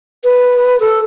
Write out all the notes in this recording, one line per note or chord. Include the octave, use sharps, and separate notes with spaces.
B4
A4